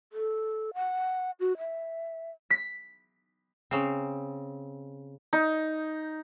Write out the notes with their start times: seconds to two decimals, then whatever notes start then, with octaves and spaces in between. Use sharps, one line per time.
0.13 A4
0.74 F#5
1.40 F#4
1.58 E5
2.50 B6
3.71 C#3 C4
5.33 D#4